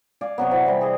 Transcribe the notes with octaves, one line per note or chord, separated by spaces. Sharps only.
D5 F5 G#5
C3 F#3 B3
C3 C4 E4
E3 G3
G#4 D#5